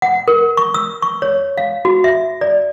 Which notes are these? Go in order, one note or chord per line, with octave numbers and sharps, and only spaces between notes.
F#5
A#4
C#6
E6
C#6
C#5
F5
F#4
E5
D5